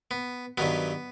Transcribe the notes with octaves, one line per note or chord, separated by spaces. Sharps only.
B3
G2 D#3 F#3 B3